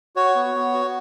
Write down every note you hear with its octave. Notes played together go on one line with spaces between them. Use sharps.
F#4 C#5
B3
B3
F#4